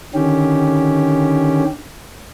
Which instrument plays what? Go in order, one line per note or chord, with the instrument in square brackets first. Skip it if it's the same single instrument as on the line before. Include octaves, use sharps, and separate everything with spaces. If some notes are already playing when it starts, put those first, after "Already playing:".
[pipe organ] D3 D#3 C#4 G4